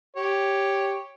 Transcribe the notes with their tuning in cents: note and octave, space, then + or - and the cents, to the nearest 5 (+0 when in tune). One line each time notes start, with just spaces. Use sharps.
G4 +0 C#5 +0